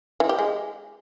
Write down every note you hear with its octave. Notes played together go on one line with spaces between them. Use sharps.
E3
G4
G#3